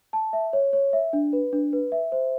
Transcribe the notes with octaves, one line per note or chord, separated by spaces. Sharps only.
A5
E5
C#5
C#5
E5
D4
B4
D4
B4
E5
C5